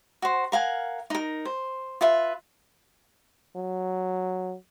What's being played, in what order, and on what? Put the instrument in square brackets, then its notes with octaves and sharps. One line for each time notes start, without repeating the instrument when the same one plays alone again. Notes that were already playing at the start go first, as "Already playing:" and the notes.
[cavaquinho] F#4 C5
A#4 F5 F#5 G#5
D#4 A#4
C5
F4 B4 E5
[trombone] F#3